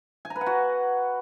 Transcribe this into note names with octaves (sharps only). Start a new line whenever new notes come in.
G#5
A#5
B4
F#5
F#4